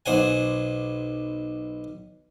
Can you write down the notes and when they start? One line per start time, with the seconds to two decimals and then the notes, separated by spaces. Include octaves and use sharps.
0.06 B1 C5 F#5 G#5